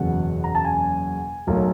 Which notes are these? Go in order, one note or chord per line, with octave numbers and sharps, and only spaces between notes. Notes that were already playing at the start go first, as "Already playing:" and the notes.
Already playing: F#1 E2 B2 F#5
A#5
A5
G#5
B1 A2 F#3 A#3